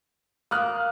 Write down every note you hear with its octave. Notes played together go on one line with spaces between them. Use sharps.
A#3 D#6 F6 F#6